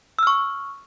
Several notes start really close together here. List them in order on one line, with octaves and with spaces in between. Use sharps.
E6 F6 C#6